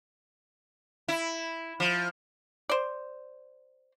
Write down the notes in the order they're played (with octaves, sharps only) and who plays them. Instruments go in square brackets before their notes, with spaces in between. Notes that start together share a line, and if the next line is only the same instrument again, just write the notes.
[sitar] E4
F3
[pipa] C5 D5